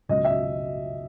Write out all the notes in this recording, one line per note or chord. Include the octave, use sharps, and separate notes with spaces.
C#2 B2 F#3 D#5
E5